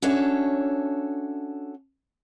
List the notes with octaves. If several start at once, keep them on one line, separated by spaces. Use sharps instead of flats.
C#4 D4 F#4 A4 C#5 E5